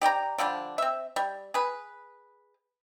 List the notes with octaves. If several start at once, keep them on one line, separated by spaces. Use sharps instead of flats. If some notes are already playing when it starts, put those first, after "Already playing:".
G4 D5 G5 A#5
D3 F3 G3 D4
C4 E5
G3
G#4 B4